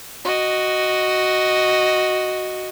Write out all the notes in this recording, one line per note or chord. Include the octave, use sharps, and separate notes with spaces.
F#4 D#5